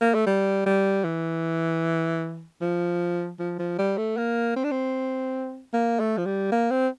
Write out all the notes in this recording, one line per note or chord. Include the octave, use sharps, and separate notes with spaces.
A#3
A3
G3
G3
E3
F3
F3
F3
G3
A3
A#3
C4
D4
C4
A#3
A3
F3
G3
A#3
C4